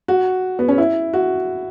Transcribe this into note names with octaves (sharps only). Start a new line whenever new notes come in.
F#4
B3
C#4
E4
F#4